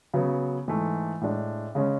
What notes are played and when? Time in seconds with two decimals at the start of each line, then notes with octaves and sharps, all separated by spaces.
0.14 C#3 F#3 B3
0.68 G#2 E3 A3
1.21 A2 G#3 D4
1.75 C#3 G#3 C#4